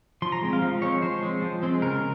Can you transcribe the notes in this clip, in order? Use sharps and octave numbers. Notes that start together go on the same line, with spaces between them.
F3 C6
A#5
G#3 C4
F5
F3
G#3 C4 C#5
F3 C5
G#3 C4
F3
G#3 C4
C#3 A#4